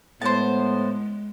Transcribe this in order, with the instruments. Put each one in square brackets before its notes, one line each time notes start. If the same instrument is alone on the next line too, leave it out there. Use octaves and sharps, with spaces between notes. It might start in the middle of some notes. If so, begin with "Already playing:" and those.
[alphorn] A2 [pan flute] G#3 [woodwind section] B3 [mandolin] C5 A5